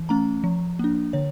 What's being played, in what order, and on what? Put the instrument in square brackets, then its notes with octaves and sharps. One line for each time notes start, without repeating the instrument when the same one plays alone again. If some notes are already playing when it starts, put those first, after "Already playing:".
Already playing: [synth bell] E3
A3 C#4 A#5
F3
A#3 D4
D3 C#5